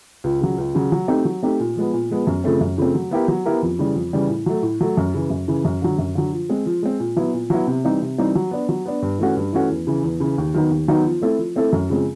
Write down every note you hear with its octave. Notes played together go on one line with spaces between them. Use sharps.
C#2
C#3 F#3
C#2
C#3 F#3
F#3
A3 C4 D#4 G4
F#3
A3 C4 D#4 G4
A#2
F3 G#3 B3
A#2
F3 G#3 B3
F#2
C#3 F3 A3 C4
F#2
C#3 F3 A3 C4
F#3
B3 E4 G4 A#4
F#3
B3 E4 G4 A#4
F2
C#3 E3 G3
F2
C#3 E3 G3
A2
F#3 A3
A2
F#3 A3
F#2
C#3 E3
F#2
C#3 E3
F#2
D3 F#3
F#2
D3 F#3
F3
G#3 C4
F3
G#3 C4
A#2
F#3 B3 E4
A#2
F#3 B3 E4
C3
E3 G3 C4 D#4
C3
E3 G3 C4 D#4
F#3
B3 D4
F#3
B3 D4
G2
E3 A3 C#4 F#4
G2
E3 A3 C#4 F#4
E2
C#3 E3
E2
C#3 E3
D#2
D#3 F#3 B3 D#4
D#2
D#3 F#3 B3 D#4
F3
A3 C4 E4 A4
F3
A3 C4 E4 A4
F#2
C#3 F3 G#3 C4